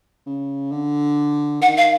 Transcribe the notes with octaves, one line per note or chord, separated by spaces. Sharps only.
C#3
D3
D#3 F#5
F5